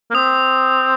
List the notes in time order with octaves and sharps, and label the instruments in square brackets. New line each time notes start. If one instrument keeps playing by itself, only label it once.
[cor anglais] A#3
[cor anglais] C4 [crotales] D#6